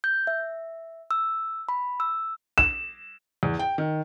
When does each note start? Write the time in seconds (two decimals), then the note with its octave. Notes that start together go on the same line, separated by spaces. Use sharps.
0.04 G6
0.27 E5
1.11 E6
1.69 B5
2.00 E6
2.58 E7
3.43 E2
3.59 G5
3.78 D#3